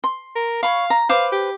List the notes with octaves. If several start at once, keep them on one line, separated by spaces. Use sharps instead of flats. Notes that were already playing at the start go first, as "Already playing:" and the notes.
C6
A#4
C#5 F5 B5 C#6
A#5
B4 C5 F5 D6
G4